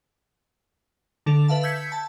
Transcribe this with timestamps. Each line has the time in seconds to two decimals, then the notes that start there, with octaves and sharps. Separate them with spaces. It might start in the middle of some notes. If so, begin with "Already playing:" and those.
1.26 D3 D4 A4 F7
1.48 B4 E5 F5 A5
1.63 E6 G6 G#6 B6 C#7
1.92 A5